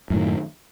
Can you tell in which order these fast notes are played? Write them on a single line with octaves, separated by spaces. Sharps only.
F#2 A2 D#3